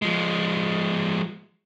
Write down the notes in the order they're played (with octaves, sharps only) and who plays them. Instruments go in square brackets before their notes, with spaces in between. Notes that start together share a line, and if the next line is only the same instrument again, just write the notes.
[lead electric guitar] F3 G#3